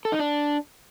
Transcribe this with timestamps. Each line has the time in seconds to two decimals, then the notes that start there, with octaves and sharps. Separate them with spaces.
0.05 A4
0.12 D#4
0.19 D4